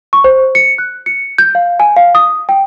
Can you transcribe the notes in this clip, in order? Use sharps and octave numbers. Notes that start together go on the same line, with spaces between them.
C#6
C5
C#7
F#6
C#7
G6
F5
G#5
F5
D#6
G5